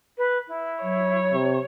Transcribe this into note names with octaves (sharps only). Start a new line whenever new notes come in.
B4
E4
F#3 C#5
C3